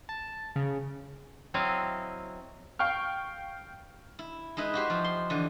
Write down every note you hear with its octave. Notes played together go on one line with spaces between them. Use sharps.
A5
C#3
F#3 C4 E4 D#5 F5
F5 G5 C#6 F6
E4
G#3 D#4 E4 B4
F#4 G4 C5
F3
C6
D3 E3